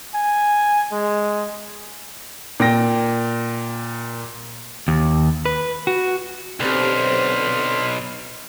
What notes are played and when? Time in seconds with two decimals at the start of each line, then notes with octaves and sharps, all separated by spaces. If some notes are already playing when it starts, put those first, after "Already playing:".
0.15 G#5
0.92 G#3
2.60 A#2 G5 A#6
4.88 D#2
5.46 B4
5.87 F#4
6.60 B1 D3 C4 G4 B5 C6 F6